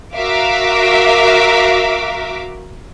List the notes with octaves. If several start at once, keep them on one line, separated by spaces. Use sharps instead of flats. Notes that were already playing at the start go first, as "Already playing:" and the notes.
F#4 A#4 E5 F5 D6